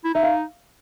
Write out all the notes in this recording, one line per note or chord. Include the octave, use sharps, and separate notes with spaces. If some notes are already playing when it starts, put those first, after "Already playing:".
E4
D#4 E5
F5